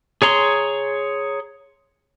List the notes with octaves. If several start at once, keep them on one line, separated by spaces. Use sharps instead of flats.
G#4 C#5 A#5 C6